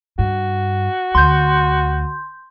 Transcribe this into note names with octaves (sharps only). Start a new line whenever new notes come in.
G2 F#4
D2 C6 G6